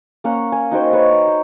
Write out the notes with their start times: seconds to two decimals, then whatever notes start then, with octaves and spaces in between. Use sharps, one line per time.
0.24 A#3 C#4 F#5 A#5
0.52 G#5
0.71 D#4 F#4 C5 G5
0.92 D#4 B4 C#5
1.11 A#5
1.28 G5